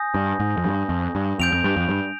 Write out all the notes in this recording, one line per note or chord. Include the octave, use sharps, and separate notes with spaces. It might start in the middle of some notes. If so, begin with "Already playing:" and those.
Already playing: G#5 D#6 G6 A#6
G2
G#2
F2
G2
F2
G2
F2 G6 D7 F7
F2
G2
F2
G2